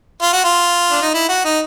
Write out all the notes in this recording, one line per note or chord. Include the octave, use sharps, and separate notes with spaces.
F4
F#4
F4
D4
D#4
E4
F#4
D#4